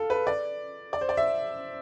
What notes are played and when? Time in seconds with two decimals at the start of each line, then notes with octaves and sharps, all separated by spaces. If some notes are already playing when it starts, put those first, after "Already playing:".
Already playing: F4 A4
0.10 B4
0.27 D5
0.93 D5
1.01 C5
1.09 D5
1.17 E5